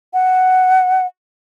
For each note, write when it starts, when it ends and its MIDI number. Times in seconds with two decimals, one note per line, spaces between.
0.13 1.06 78